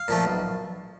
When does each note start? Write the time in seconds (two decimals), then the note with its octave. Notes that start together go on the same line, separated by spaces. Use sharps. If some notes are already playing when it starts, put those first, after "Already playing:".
Already playing: F5
0.08 A#2 F3 A3
0.25 B1